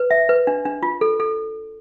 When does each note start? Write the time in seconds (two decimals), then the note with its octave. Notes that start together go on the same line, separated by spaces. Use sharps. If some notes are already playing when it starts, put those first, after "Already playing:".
Already playing: B4
0.11 E5
0.29 B4
0.47 D4
0.65 D4
0.83 F4
1.01 A4
1.20 A4